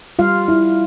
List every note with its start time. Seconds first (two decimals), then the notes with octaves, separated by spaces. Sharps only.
0.19 G3 F4 F5
0.48 E4